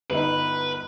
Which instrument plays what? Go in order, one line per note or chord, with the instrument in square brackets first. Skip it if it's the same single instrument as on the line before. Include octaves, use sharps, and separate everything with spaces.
[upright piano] G1 D#4 [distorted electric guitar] B4